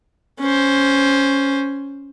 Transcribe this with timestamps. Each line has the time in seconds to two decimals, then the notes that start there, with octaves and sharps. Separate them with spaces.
0.40 C#4 C5